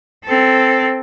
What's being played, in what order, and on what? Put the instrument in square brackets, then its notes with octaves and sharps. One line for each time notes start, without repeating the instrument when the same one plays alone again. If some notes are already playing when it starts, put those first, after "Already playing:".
[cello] C4 A4